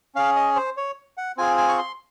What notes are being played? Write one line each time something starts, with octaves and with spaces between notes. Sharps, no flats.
C#4 G#4 F5
D#5
C5
C#5
F#5
C4 F4 G#4 G#5
G#5
C#6
C6